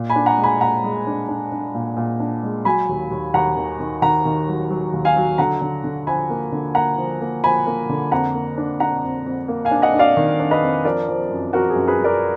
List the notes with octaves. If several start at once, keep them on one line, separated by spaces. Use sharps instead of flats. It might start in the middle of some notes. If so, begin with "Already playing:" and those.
Already playing: A#2
G#5 B5
D4
F#5 A#5
G#3
G#5 B5
A#2 F#5 A#5
G#3
D4
D4
D4
A#2
A#2
D4
G#3
F#3 G#5 B5
D#2
D#2
D#2 F#5 A#5
D#3
D#3
D#3 F#5 A#5
D#3
F#3
F#3
D#2
F5 G#5
F#3
D3 F#5 A#5
D3
D3
F3 G#5 B5
A#3
D3
A#3 F#5 A#5
F3
A#3
F3 G#5 B5
A#3
D3
F2 F#5 A#5
A#3
D4
D4 F#5 A#5
F2
F2
A#3
F5 G#5
D4
D#5 F#5
D4
D5 F5
D#3
D4
B4 D#5
F2
F3 A#4 D5
F3
F#2
F3 F#4 A#4
G#4
F#2
G#4 B4
F#2
A#4 D5